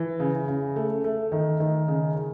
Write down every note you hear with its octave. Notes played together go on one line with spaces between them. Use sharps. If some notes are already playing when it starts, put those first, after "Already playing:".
Already playing: E3
C#3
C#3
A3
A3
D#3
D#3
C#3
C#3